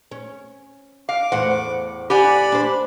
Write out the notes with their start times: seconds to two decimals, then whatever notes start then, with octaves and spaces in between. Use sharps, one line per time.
0.11 C#4
1.09 F5 D6
1.32 E2 A2 C5 F#5
2.10 G4 D5 F#5 G#5 B5
2.52 D4 C5